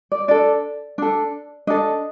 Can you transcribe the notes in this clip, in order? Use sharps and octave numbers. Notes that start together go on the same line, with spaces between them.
D5
D4 A4 D5
D4 A4
D4 A4 D#5